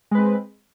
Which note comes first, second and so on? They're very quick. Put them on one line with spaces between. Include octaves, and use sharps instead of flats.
G#3 B4 C4